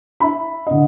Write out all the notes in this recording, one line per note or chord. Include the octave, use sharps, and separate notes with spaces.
E5 B5
D3 D#5